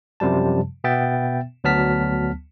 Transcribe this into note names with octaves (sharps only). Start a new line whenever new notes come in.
F#2 C3 F3 G3 A5
B2 B3 E5 G5 A6
D2 F#3 B3 A5 F6 B6